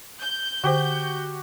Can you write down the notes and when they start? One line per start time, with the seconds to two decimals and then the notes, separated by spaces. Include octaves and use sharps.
0.21 G6
0.64 D3 F#4 G4 C5